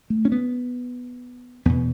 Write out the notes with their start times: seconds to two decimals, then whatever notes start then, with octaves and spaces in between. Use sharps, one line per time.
0.10 A3
0.25 C#4
0.32 B3
1.65 E2 B2 B3